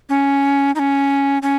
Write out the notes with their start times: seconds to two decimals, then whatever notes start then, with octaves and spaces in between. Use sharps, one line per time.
0.09 C#4
0.75 D#4
0.79 C#4
1.42 C#4